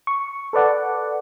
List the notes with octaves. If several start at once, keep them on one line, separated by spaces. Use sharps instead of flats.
C#6
A4 B4 D5 F#5